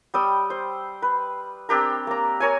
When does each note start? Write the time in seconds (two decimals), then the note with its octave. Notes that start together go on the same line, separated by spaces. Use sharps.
0.14 G3 G5 D#6 E6
0.50 C5
1.02 B4
1.69 C4 D4 G4 A#4
2.07 A#3 A#5
2.40 A#4 C#5 G#5